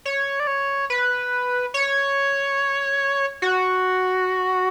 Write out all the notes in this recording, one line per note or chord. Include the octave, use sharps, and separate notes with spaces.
C#5
D5
C#5
B4
C#5
F#4